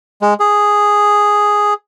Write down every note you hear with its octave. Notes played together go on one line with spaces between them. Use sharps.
G#3
G#4